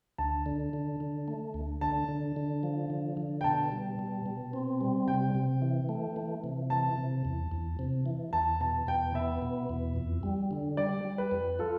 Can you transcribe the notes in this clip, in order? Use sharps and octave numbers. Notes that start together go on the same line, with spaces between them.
D2 A5
D3
D3
D3
A3
D2
D3 A5
D3
D3
F3
D3
D3
G5
B2 A5
G3
B2
B2
C4
G3
C3 G5
C3
E3
A3
E3
C3
E3 A5
C3
E2
E2
C3
E3
E2 A5
B2 A5
E2 G5
B3 E5
B2
E2
F2
G3
D3
G3 D5
G3
B4
F2
F4 A4